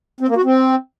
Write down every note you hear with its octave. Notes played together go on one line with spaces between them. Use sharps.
C4
A#3
F#4
C4